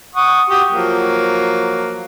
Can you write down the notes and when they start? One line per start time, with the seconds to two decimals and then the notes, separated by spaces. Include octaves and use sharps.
0.15 F#5 C#6 D#6
0.49 F#4 G4 D#6
0.70 F3 F#3 A#3